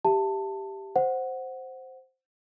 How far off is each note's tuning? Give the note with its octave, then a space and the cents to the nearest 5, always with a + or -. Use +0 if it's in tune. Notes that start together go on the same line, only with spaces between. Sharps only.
G4 +0 E5 +20 A5 +15
C5 +0 F#5 +0